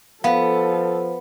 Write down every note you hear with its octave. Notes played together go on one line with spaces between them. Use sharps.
F3 B3 A4 F5